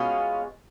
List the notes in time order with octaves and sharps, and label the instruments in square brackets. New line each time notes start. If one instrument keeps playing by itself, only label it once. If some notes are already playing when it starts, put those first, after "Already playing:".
Already playing: [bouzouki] B2 G#3 C#4 F4